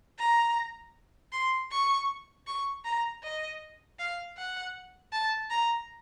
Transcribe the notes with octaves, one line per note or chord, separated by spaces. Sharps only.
A#5
C6
C#6
C#6
A#5
D#5
F5
F#5
A5
A#5